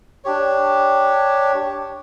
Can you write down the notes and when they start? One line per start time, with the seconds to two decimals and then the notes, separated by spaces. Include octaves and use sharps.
0.24 D4 G4 C#5